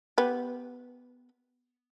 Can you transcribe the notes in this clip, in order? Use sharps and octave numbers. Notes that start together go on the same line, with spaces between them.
B3 G4